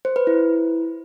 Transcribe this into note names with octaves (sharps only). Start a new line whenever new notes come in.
C5
B4
E4